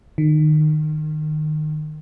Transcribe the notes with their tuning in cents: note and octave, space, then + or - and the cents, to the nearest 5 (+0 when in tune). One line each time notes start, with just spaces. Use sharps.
D#3 -25